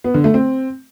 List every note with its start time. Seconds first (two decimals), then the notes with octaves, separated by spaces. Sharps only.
0.04 B3
0.14 D3
0.24 A3
0.34 C4